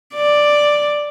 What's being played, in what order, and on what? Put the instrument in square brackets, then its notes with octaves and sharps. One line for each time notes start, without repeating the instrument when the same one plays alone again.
[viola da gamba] D5